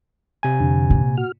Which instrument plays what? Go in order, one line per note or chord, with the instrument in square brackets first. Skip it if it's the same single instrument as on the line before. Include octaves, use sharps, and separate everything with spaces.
[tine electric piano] C3 G#5
[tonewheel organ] F2 D3
[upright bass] A#2
[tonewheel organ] F#4 F6